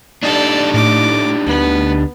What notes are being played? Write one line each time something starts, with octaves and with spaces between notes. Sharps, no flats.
D4 D#4 G4 A4 D5
A2 D6
D2 B3